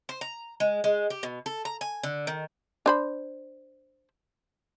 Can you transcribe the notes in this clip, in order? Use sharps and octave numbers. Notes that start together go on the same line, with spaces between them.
C5
A#5
G#3
G#3
G4
B2
A4
A#5
G#5
D3
D#3
D4 C5 B5